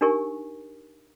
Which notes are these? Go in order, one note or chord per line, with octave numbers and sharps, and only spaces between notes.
D4 D#4 G4 A#4 G#5 C#6